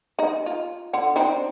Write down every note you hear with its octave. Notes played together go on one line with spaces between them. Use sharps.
D#4 D#5
F4
D3 F#5
C4 D4 D#4